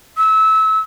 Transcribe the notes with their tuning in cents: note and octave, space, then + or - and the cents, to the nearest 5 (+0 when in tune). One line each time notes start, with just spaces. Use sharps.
E6 -25